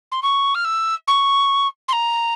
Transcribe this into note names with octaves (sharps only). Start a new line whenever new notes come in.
C6
C#6
F6
E6
C#6
C6
A#5